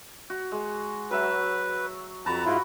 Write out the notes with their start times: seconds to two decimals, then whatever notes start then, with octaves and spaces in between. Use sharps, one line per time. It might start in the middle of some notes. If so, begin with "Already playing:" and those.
0.30 F#4
0.52 G#3
1.11 F#3 B4 E5 F#5
2.26 F2 F#4 B4 A5 A#5
2.45 G#2 E4 F4